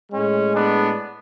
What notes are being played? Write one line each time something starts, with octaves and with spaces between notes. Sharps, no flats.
A2 G#3 C#4
B3 D4